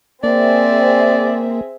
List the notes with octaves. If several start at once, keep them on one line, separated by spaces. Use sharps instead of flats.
A#3 C4 G#4 D5 E5